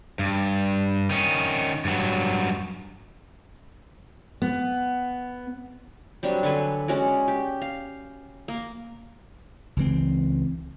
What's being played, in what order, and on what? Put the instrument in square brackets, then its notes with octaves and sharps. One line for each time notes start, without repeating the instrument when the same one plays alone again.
[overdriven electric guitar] G2
D#3 C#4
G2 F#3
[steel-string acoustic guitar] B3
[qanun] F#3 G3 C4 D4
D3 A4 B4 G#5
G#3 C#4 F#4 D5
G4
F5
A#3
[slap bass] C#2 E3 C4